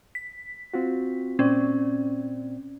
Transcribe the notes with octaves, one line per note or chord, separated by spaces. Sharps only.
B6
C4 F4 F#4
A#2 C4 C#4 D5